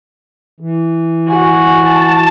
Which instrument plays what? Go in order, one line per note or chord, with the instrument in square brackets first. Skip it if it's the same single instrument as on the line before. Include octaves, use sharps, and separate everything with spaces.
[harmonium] E3
[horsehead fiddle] F#4 [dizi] G#5
[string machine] A5